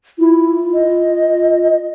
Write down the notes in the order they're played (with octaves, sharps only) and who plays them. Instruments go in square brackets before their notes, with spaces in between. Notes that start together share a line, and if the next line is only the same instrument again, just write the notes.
[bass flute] E4 [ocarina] F4
[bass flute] D#5